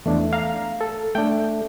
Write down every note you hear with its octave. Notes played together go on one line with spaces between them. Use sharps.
E2 A3 D4
F5 A#5
A4
A3 D4 G5